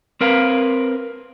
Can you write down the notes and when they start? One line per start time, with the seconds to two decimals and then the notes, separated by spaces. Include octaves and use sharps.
0.21 C4 A#4 B4 F5